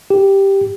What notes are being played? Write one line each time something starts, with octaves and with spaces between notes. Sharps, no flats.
G4